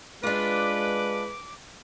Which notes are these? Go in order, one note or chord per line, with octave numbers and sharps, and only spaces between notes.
G#3 D4 F4 B4 D6